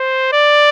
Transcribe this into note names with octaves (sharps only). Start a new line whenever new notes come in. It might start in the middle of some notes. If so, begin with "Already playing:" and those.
Already playing: C5
D5